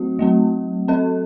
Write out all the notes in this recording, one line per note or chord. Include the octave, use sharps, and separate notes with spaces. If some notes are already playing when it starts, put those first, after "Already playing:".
Already playing: F#3 A3 C4 F#4
F#3 A3 C4
F#3 C4 A4